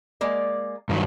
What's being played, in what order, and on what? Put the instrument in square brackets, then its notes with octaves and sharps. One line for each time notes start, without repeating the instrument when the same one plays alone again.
[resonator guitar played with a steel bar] G#3 A#3 D5
[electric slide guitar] G2 D#3 F#3